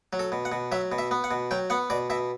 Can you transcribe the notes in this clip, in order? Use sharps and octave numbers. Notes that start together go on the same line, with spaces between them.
F#3
A4
B2
F#5
B2
F#3 E5
B2
E5
B3
F#5
B2
F#3 G5
B3 F#5
B2 D5
B2 E5